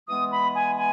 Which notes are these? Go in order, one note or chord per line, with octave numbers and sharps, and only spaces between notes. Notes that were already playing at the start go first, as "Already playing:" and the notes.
E3 G#3 B3 D#6
B5
G#5
G#5